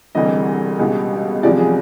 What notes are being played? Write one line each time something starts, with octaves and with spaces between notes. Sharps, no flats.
E1 D2 C3 E3 G3 D#5
C#2 B2 G3
F#1 E2 C3 F3 G#3 D5
G#4